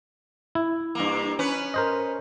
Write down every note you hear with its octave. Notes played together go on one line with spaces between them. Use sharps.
E4
G2 A#3
C#4 B4
A#4 C5 D#5